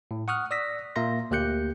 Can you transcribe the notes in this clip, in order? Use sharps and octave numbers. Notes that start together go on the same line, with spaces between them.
A2
F#5 C#6 D#6 F6 F#6
D5 D#6 E6 A#6 B6
A#2 A#3 E5 F5 C6 A#6
D2 A#3 G4 F#6 G6 C#7